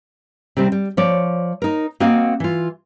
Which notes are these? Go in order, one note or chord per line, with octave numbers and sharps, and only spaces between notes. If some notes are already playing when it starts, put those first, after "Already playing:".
C3 D#3 G3 C4
G3
F3 C#5 D5
D#4 A#4
A#3 C4 F#4 D#5 F5 F#5
E3 F4